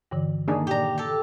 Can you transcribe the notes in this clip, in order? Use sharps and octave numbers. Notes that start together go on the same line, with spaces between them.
G2 D3 E3
D#3 A#3 D4 D#4 G#4
A#2 G4 D5 A#5
G4 A4